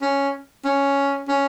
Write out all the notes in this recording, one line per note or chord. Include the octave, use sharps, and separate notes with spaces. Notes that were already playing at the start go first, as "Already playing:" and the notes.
C#4
C#4
C#4